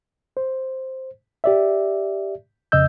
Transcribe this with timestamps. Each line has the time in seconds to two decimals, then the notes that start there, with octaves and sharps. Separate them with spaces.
0.37 C5
1.44 G4 D5 E5
2.72 F2 C#3 D#5 E6 G6